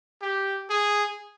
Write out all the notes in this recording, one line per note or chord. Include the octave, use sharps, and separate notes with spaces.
G4
G#4